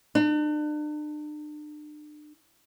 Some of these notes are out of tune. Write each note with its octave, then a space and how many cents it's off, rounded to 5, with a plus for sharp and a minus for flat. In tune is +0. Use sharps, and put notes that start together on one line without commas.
D4 +40